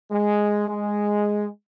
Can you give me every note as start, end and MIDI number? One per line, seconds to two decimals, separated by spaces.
0.11 0.64 56
0.68 1.48 56